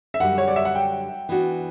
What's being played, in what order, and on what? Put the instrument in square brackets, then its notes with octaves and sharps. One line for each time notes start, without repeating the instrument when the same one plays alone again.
[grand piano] E5
[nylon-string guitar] F#2 D3 G3 [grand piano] F#5
[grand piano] C#5
D5
E5
F#5
G5
[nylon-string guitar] E3 B3 D4 F#4